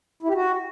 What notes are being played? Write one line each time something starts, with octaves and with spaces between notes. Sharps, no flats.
E4
G4
F#4